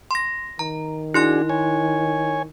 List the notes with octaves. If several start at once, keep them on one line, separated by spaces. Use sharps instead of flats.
C6 A#6
D#3 A#5
D4 E4 F#4 G#4 C6 F#6
C#5 G#5